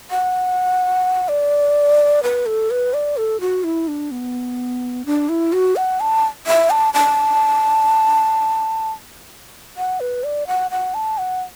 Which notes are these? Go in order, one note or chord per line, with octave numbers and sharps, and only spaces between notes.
F#5
D5
B4
A4
B4
D5
A4
F#4
E4
D4
B3
D4
E4
F#4
F#5
A5
E5
A5
A5
F#5
B4
D5
F#5
F#5
A5
F#5